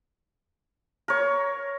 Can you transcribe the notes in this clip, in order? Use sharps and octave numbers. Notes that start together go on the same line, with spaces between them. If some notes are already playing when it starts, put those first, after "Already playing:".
A#4 C#5